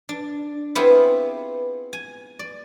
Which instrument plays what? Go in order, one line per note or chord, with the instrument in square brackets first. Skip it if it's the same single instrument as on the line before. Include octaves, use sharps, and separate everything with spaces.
[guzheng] D4
B3 C4 E4 F4 G4 G#4
G#5
D5